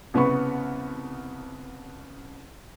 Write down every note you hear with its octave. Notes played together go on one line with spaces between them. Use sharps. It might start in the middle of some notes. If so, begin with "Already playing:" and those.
C2 C#3 B3 B4 B5 C#6